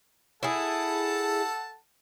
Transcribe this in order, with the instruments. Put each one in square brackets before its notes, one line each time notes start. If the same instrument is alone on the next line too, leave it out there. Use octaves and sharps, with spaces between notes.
[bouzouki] E4 G#4 [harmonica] A4 F#5 A5